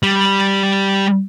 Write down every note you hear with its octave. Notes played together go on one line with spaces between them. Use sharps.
G3